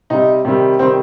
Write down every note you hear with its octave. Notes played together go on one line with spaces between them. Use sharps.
C3 G3 D#4
C3 D#3 G3
C3 D#3 G3 C4